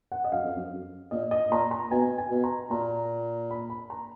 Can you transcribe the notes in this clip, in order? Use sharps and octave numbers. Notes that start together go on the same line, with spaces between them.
F#5
D#5
F#2 F5
F2
F#2
F#2
A#2 D#5
D#5
A#2 A#5
A#5
B2 G#5
G#5
B2
A#5
A#2 A#5
B5
B5
A#5